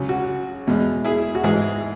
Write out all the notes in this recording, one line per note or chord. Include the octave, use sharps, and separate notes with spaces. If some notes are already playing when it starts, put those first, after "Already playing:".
Already playing: C#2 C#3 F#3
F#4
E2 B2 G#3
E4 G#4
F#4
G#2 E3 G#3 E4 G#4